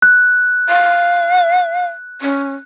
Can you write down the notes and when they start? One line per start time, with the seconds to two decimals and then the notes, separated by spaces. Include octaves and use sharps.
0.02 F#6
0.69 F5
2.21 C#4